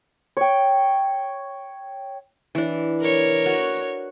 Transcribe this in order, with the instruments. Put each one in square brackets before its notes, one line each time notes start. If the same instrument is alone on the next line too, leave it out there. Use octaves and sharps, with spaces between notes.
[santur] C#5 G5
[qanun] E3 D4
[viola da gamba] A#4 C#5
[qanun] F#4